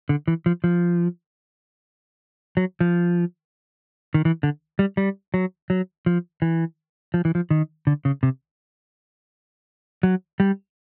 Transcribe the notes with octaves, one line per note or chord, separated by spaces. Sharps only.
D3
E3
F3
F3
F#3
F3
D#3
E3
D3
G3
G3
F#3
F#3
F3
E3
F3
E3
F3
D#3
D3
C#3
C3
F#3
G3